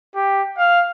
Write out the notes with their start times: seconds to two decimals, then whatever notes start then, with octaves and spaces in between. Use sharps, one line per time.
0.15 G4
0.58 F5